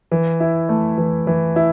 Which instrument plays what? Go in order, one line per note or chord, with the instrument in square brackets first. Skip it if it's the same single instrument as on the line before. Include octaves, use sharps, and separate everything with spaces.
[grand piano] E3
E4
A3
E3
E3
E4